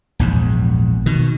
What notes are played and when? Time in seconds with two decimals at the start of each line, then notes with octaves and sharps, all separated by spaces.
0.19 A#1 E2 G#2
1.06 B2 D#3